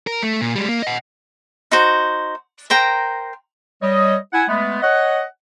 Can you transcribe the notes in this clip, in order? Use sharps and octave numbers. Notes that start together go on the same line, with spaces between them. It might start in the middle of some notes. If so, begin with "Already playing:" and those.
A#4
A3
A#2
G3 G#3
A#3
D#5 F#5
D#4 F#4 C5
A#4 C5 G5 A#5
G3 C#5 D#5
E4 F#5 G#5
G#3 A3 B3
C#5 D#5 F#5